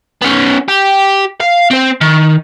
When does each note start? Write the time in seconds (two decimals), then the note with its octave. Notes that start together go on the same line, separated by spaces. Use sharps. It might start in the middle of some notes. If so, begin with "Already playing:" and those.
0.22 B3 C#4
0.68 G4
1.41 F5
1.71 C4 C5
2.01 D#3